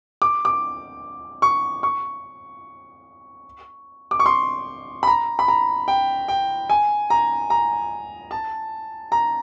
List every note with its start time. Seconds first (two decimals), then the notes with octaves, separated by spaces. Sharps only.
0.22 D6
0.45 D6
1.42 C#6
1.83 C#6
4.11 D6
4.19 C#6
4.26 C6
5.03 B5
5.07 A#5
5.39 B5
5.48 A#5
5.88 G5
6.28 G5
6.70 G#5
7.10 A#5
7.50 A#5
8.31 A5
9.12 A#5